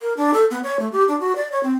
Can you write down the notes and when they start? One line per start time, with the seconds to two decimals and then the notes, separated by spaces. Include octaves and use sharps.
0.01 A#4
0.17 D4
0.34 A4
0.51 B3
0.63 C#5
0.79 A3
0.92 G4
1.08 D4
1.20 F#4
1.36 D5
1.52 C#5
1.63 C4